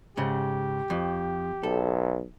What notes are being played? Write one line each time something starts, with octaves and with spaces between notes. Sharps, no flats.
G#2 C#3 G4
F2
B1 A4